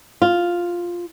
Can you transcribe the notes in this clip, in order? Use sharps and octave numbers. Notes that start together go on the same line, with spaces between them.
F4